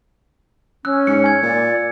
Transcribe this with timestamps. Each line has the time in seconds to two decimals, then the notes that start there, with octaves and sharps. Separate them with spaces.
0.85 C#4 E6 F#6
1.07 G#2 C#7
1.24 G#5 G#6
1.42 A#2 D5